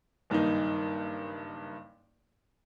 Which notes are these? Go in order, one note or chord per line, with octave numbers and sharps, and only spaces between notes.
F#1 G2 D#3 A#3 D#4